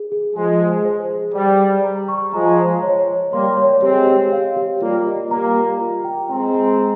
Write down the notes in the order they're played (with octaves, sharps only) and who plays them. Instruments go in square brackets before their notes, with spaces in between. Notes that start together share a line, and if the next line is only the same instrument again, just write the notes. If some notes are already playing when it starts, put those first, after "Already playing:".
Already playing: [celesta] G#4
G#4
[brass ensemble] F3 G#3 [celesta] G#5
[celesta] G#4
C5
G#4
[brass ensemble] G3 [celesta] G5
[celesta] C5
A#5
C#6
[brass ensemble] F3 G#3 [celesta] A#5
[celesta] D#5
C#5
C#5
[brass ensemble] G3 A#3 [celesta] C6
[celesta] C#5
[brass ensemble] G#3 C4 [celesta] G4
[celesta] G4
F5
G4
[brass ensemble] G3 A#3 [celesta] F4
[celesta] D#5
[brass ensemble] G3 A#3 [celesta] A#5
[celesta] A#5
F4
G5
[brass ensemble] G#3 C4 [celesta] A#5
[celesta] A#5
A#5